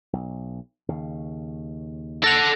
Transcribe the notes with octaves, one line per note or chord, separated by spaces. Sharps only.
B1
D#2 C#3
A4 F#5 A#6 F7